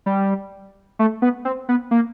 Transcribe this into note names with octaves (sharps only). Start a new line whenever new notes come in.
G3
A3
B3
C4
B3
A#3